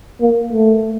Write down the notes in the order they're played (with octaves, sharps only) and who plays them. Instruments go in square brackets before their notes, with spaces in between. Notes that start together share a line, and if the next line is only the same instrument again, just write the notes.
[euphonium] A#3
A3